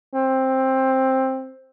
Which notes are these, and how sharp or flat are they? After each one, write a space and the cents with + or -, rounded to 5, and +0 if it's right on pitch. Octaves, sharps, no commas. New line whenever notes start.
C4 +10